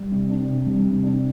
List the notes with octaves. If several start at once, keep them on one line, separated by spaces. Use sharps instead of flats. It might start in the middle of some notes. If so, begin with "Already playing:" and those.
Already playing: G3
C3
D4
C3
G3
C3
D4